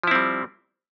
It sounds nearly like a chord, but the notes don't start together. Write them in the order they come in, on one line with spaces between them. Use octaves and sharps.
F3 E4 C4 G3